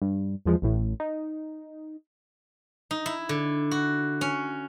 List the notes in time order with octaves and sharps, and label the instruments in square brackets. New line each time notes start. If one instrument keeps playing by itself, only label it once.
[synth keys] G2
E2 F3 G#3
A1 A2
D#4
[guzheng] D#4
E4
D3
F#4
C#4